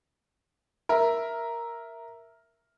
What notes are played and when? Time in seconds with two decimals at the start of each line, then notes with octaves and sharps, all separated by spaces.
0.89 A#4 E5